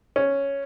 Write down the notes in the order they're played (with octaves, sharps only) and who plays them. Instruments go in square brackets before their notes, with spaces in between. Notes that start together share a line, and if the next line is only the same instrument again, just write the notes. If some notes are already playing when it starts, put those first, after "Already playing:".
[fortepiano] C#4